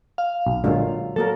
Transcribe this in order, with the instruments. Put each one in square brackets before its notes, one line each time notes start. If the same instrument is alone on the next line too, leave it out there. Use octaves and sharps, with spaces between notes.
[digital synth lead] F5
[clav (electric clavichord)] B1
[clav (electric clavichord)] A#2 D3 [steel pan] F#3 G#3 F4
[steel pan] F#3 A#3 A#4 [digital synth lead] A4